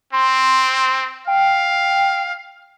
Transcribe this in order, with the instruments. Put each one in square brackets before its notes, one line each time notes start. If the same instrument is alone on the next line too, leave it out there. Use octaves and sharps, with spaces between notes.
[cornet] C4 [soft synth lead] C6
[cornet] F5 [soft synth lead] G5